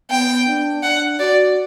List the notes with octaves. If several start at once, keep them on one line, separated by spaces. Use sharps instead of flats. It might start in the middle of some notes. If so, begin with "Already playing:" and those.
B3 G5
D4
D4 F#5
F#4 D5